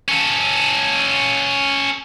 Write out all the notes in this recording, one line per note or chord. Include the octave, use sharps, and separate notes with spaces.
C#4 A4